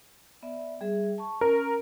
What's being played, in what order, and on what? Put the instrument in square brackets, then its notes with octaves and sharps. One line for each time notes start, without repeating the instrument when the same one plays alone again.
[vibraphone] B3 D5 E5
G3 G#4 E5
A5 C#6
[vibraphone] C#4 [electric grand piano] A#4